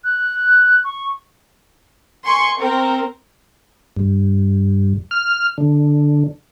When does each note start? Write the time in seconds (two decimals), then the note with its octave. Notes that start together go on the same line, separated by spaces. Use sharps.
0.04 F#6
0.84 C#6
2.25 G#5 C6 C#6
2.58 C4 A#4
3.97 G2
5.11 F6
5.58 D3